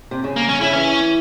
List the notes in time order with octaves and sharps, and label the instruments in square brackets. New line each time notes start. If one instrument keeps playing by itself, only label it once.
[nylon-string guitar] C3
C#3
[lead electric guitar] A#3
C#4
[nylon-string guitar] C#3 [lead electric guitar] E4
[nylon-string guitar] E3 [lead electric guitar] C#4